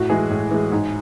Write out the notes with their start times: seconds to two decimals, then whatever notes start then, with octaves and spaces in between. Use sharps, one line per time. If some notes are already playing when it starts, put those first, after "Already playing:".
Already playing: A2 F#4
0.10 E3 G#3 G#4
0.30 A2
0.51 E3 G#3
0.72 G#2